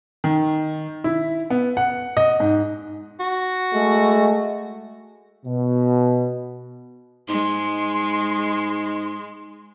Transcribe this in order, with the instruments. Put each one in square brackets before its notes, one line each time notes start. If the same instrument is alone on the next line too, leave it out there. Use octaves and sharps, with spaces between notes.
[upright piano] D#3
E4
B3
F#5
D#5
G#2
[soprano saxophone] F#4
[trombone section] G#3 A3
[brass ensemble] B2
[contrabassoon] G#2 [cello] G#3 [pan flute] C6